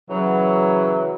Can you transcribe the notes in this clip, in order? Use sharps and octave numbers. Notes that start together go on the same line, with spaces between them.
C#3 E3 F#3